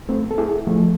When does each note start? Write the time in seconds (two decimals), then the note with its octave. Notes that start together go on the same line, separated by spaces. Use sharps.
0.09 A3 C4
0.31 A4
0.38 E4 G#4
0.67 F3 A3